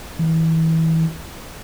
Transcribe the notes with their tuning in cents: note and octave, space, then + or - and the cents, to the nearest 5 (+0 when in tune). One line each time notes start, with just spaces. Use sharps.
E3 -30